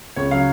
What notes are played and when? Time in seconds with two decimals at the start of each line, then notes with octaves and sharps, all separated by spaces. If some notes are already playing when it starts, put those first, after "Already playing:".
0.16 C#2 C#5
0.31 C#3 F#3 F5